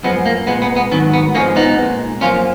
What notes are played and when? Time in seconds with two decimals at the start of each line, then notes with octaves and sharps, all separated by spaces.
0.03 F#2 F3 G#3 B3
0.26 A#3
0.47 A#2 G#3 B3
0.62 B3
0.76 B3
0.91 G#2 D#3 F#3 B3
1.13 B3
1.35 G#2 F3 G#3 A#3 C#4
1.56 B3 D#4
1.78 A#2 G#3
2.21 F#2 F3 A#3 C#4 F4